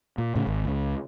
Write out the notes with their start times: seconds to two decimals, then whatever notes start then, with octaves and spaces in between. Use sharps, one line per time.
0.18 A#2
0.35 A2 C#3
0.47 G#1
0.65 C#2 C#3